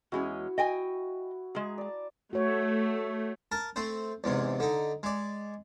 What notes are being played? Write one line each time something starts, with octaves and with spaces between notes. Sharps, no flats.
E2 G#3 C#4 E4 F#4
D#5 G5 G#5
G#3 G#4 A#5
D5 A5
A3 F#4 C#5
A#4 A5
A3 C4 C5
E2 G#2 C3
D3 D#4
G#3 D5